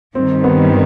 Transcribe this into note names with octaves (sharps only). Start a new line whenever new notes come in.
G2 D#3 G3 C4
B3